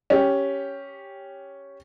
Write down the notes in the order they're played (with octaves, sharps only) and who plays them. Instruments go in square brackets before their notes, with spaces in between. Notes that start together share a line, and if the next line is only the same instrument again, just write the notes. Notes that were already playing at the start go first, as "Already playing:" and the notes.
[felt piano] C#4 G4